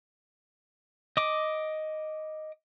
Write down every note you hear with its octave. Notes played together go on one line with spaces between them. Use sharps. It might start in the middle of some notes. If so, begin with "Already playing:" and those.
D#5 D6